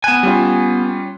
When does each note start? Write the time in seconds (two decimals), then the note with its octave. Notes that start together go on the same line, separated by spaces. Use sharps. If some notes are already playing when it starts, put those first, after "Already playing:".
0.04 B3 G#5 F#6 E7
0.23 G3 C#4 F4